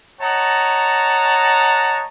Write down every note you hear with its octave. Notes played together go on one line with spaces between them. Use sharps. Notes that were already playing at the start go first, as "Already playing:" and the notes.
C#5 D#5 F#5 A5 A#5